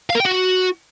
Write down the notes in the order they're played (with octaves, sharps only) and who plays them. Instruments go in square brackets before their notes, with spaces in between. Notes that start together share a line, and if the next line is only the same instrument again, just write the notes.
[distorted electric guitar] F5
A#4
G5
F#4